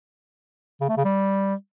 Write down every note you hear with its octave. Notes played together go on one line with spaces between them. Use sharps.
C#3
A3
C#3
G3